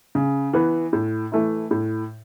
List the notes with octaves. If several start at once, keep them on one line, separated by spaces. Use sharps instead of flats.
C#3
E3 B3
A2
E3 A3 E4
A2